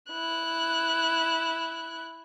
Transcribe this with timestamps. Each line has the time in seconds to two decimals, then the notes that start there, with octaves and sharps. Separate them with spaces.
0.11 E4 F#6